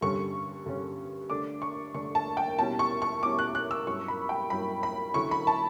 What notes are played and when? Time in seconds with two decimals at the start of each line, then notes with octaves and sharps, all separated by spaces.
0.01 G2 D3 G3 C#4 C#6
0.66 G2 D3 G3 C#4
1.30 D3 A3 D4 D6
1.62 C#6
1.94 D3 A3 D4 C#6
2.15 A5
2.37 G5
2.59 B2 G3 C#4 E4 A5
2.79 C#6
3.02 C#6
3.23 B2 G3 C#4 E4 D6
3.39 F#6
3.55 F#6
3.71 E6
3.87 G2 F#3 C#4 E4 C#6
4.08 B5
4.29 G5
4.50 G2 F#3 C#4 E4 B5
4.83 B5
5.14 D3 F#3 C#4 E4 C#6
5.31 B5
5.47 A5